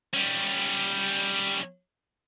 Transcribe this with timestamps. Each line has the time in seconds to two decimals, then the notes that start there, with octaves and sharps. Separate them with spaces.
0.14 G3 C#4